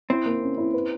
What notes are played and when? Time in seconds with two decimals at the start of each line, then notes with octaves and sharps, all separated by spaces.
0.10 C4 E4
0.26 A#3
0.42 C#4
0.58 E4
0.74 B4